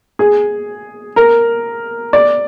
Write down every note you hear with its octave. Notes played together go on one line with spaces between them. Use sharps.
G#4
A#4
D5